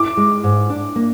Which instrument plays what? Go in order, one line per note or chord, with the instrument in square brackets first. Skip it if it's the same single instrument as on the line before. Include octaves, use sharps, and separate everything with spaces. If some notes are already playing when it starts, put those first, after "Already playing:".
Already playing: [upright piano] D6
[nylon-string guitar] G#3
G#2
D4
A#3